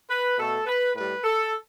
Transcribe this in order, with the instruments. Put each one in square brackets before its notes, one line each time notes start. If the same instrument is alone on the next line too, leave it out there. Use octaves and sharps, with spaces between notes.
[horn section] B4
B2 A3 A4
B4
A2 G3 B4
A4